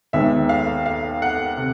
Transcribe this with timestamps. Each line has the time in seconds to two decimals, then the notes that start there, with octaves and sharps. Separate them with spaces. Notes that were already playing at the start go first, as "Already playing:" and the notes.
0.13 D#2 D#3 G#3 B3 E5
0.49 F5
0.86 F5
1.22 F#5
1.57 C3